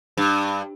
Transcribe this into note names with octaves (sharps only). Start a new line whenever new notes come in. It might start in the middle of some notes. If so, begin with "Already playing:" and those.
G2